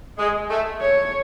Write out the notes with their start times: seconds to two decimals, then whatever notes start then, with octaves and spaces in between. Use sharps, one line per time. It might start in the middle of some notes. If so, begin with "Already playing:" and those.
0.18 G#3
0.50 A3
0.81 C#5